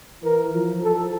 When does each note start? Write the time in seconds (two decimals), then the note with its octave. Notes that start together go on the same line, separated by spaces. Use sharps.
0.23 E3 A#4
0.54 F3
0.82 F3 A4